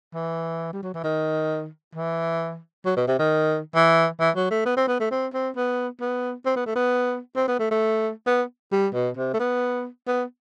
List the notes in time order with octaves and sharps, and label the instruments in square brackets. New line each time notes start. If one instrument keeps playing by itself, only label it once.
[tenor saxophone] E3
G3
F#3
E3
D#3
E3
F#3
B2
C3
D#3
E3
E3
F#3
A3
B3
C4
B3
A3
C4
C4
B3
B3
C4
B3
A3
B3
C4
B3
A3
A3
B3
G3
B2
C3
A3
B3
B3